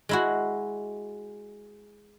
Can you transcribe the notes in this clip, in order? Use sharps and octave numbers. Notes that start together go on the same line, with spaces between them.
G#3 E4 F#4